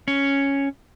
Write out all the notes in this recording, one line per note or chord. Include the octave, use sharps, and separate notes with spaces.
C#4